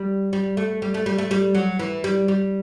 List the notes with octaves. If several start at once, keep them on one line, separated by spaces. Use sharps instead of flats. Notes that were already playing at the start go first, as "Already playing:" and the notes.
Already playing: G3
G3
A3
G3
A3
G3
A3
G3
F#3
E3
G3
G3